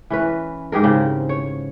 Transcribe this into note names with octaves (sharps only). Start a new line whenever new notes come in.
E3 C#4 B4
G#2 G4 G#4 A#4
C#3 C4
C#5